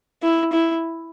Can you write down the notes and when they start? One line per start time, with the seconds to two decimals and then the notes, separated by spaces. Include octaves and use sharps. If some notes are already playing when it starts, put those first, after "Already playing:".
0.22 E4
0.52 E4